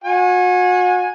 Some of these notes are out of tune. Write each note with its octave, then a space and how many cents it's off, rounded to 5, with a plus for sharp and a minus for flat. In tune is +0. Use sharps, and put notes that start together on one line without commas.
F#4 -35 G#5 +0